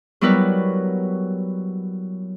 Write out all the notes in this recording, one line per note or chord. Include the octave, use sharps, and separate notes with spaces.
F#3 G3 B3 E4 A#4 B4